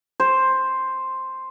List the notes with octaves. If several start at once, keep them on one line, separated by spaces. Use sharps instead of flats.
C5